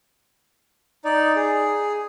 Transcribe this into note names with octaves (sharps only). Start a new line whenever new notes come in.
D#4 D5
G#4